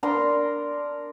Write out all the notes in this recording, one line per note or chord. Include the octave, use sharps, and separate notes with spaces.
D4 A#4 A#5 C6